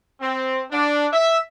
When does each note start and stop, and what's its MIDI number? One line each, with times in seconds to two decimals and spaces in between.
0.21 0.62 60
0.71 1.06 62
1.12 1.37 76